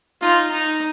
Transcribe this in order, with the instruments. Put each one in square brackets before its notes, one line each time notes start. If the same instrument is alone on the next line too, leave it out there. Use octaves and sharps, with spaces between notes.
[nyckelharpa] D#4 [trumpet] F4
[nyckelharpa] D#4